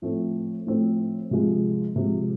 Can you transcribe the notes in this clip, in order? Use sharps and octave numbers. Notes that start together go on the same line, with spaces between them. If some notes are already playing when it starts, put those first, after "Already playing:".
A2 F3 A3 C4
A2 F3 A3 C4
C3 F3 G#3
C3 F3 G#3